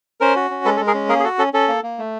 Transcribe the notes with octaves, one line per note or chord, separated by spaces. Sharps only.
C#4 A#4 C5
F#4
C#4
G#3 A4 B4
A4
G#3
G#4 A#4
C#4
A#3 G#4 A#4
G#4
F#4 A4
C#4 A4
C#4 A4
A#3
A#3
A3